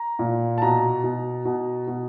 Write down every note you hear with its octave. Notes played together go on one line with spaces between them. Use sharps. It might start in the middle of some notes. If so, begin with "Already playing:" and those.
Already playing: A#5
A#2
A5
B2 A#5
B2
B2
B2